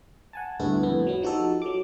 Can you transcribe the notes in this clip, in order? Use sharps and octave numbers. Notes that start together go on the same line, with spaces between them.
F#5 G#5 A5
D2 G2 B3 E4 A4
F2 A2 B3
F#3 B3
F3 D#4 F#4 G4 A4
F#3 D6